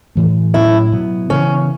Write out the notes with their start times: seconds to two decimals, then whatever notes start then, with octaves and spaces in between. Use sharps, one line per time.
0.15 A2 E3 A3
0.54 A2 F#3 C#4 E4
0.92 B2 F#3 B3
1.30 C#3 E3 B3 C#4